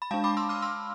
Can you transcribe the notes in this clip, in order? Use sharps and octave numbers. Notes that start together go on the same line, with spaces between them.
B5
G#3 D4 F5 A5
B5 D6
C6 E6
D6 F6
C6 E6